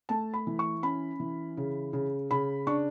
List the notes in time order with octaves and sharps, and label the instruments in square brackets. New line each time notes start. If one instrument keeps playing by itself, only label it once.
[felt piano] A3 A5
B5
E3
C#6
C#4 B5
E3
C#3
C#3
C#3 B5
D4 C#6